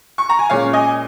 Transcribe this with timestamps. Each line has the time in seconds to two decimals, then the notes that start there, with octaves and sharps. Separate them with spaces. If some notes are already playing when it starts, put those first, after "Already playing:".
0.18 C#6
0.29 A#5
0.39 G#5
0.50 A#2 G#3 C#4 C#5 F5
0.73 D#5 G#5